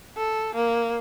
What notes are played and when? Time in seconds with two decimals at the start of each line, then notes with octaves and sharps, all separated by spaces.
0.17 A4
0.55 A#3